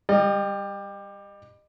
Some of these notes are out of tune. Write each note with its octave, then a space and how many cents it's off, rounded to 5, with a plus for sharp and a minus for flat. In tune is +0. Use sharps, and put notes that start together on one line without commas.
G3 +15 D#5 -35